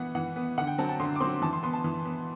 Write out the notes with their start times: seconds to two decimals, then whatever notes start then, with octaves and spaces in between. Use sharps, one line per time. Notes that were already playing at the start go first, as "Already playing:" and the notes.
Already playing: E3 B3 F#5
0.15 E3 F#5
0.36 B3
0.58 D3 F#5
0.67 G5
0.78 F#3 C4 A5
0.89 A5
1.00 D3 C6
1.16 D6
1.20 F#3 C4 C6
1.42 E3 A5
1.53 C6
1.63 B3 C6
1.73 A5
1.84 E3
2.05 B3